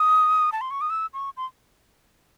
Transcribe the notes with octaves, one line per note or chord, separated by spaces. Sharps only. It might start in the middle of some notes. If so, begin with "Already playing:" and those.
Already playing: D#6
A5
C6
C#6
D#6
E6
C#6
C6